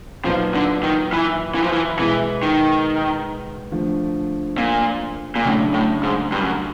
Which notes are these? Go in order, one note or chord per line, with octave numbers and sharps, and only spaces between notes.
A#2 F3 F#3 B3 D#4
D3
D#3
E3
E3
F3
E3
B2 E3 G#3 B3
D#3
D3 F3 A3
A#2
A#2
A2 C#3 F#3 A3 D4
A2
G#2
G2
F#2